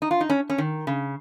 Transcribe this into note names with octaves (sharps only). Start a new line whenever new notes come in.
D#4
F4
D#4
C#4
C#4
D#3
C#3